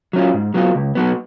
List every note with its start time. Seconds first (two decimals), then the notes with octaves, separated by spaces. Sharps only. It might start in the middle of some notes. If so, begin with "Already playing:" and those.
0.13 F#3 C#4 F4
0.34 G#2
0.54 F#3 B3 F4
0.75 C#2
0.95 B2 F#3 B3